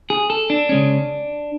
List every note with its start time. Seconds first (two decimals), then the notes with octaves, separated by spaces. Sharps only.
0.10 G#4
0.30 A4
0.50 D4
0.69 C#3 G#3 C#4